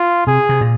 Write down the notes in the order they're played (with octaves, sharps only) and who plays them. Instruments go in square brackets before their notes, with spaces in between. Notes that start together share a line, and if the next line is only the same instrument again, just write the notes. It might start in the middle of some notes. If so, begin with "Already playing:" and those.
Already playing: [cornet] F4
[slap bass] C3 [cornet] G#4
[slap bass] C3
A#2